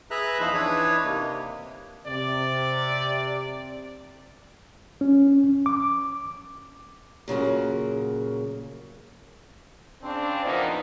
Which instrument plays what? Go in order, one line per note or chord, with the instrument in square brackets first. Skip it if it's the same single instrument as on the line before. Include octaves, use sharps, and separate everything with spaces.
[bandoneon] G#4 B4 E5 A#5 F#6
E2 E3 F3 D#4 C5 B5
E3 D4 D#4 B4 C#5
C3 A#3
[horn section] C3 [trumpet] D5
[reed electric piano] C#4
D6
[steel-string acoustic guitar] A#2 C#3 F#3 A#3
[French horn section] C#3 C4 D4
E2 A#2 F3 A#3 B3 D#4